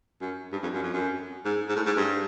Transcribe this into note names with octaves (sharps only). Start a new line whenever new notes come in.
F#2
G2
F2
F#2
F2
F#2
G#2
G#2
A2
G#2
G2